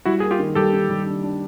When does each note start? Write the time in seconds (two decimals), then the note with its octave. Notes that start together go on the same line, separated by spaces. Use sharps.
0.05 G3 E4 F#4
0.20 A#3 G#4
0.31 F4 G4
0.39 D#3
0.55 G3 G4 A4
0.73 D#3
0.89 G3
1.06 D4
1.23 D4